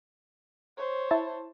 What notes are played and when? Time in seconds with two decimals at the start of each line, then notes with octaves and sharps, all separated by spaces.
0.77 C5 C#5
1.11 E4 A5